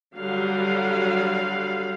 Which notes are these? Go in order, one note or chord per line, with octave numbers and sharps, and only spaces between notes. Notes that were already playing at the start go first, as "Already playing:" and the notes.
D3 F#3 G3 F5 F#5